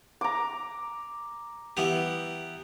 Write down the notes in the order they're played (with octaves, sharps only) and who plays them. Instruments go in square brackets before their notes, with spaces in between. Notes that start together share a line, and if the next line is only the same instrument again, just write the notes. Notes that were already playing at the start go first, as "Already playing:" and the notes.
[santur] A#5 D6
[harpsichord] E3 B3 G4